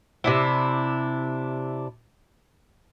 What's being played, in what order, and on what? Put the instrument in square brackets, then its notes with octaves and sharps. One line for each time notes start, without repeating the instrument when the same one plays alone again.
[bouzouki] C3 D4 E4